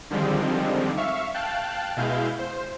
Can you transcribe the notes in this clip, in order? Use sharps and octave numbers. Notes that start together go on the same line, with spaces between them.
D3 D#3 F3 G3 G#3 C4
E5 F5 C#6
F5 G5 A5 F#6
B2 G#3 E4 F5 G6
C5